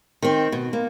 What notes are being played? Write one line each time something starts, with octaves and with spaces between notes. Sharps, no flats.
D#3 C4
B2
A#3